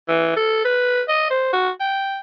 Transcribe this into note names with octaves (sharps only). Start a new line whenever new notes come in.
E3
A4
B4
D#5
C5
F#4
G5